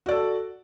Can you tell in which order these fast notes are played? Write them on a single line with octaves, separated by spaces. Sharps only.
F#4 D5 A4